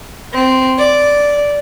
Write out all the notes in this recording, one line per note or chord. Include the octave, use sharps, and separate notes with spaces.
C4
D5